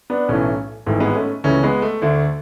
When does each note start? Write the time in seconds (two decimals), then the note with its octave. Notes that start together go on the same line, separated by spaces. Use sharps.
0.10 B3 D4
0.29 B1 A2 E3 A3 C#4
0.86 G#1 G#2 E3 A3
1.00 G#3 B3
1.15 A3 C#4
1.44 C#2 C#3 E3 A3 C#4
1.63 G#3 B3
1.82 A3
2.02 D2 D3 A3